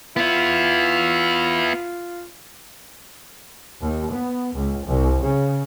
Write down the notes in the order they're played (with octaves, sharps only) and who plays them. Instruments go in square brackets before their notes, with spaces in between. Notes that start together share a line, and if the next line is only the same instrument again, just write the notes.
[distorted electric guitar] B3 E4 [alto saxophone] F4
[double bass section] D#2
B3
C#2
C2
C#3